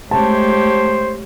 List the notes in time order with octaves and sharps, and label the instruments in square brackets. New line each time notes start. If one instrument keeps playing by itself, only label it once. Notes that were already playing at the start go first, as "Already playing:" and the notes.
[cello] G#3 A3 [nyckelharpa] G4 C#5 [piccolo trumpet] C5 [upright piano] A5